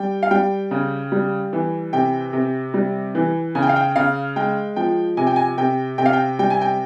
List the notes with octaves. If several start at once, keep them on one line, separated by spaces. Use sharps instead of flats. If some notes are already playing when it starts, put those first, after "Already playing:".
Already playing: G3 G5
F5
G3 G5
C#3
G3
E3
C3 G5
C3
G3
E3
C#3 G#5
G5
F5
G5
C#3 F5
G#3 G5
F3 G5
C3 G#5
G5
G#5
C3 G5
C3 G5
F5
G5
G3 G5
G#5
G5